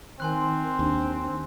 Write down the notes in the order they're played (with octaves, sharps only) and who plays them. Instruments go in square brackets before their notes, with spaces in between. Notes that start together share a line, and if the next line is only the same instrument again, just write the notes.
[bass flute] D#3 [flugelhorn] C4 [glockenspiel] G#5 C6 F#6
[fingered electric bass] D#2 [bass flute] D4